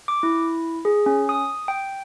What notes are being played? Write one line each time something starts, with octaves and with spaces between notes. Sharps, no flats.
D6
E4
G#4
C#4
D#6
G5